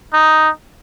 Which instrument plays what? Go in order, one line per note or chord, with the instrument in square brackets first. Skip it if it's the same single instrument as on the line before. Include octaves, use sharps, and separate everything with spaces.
[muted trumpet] D#4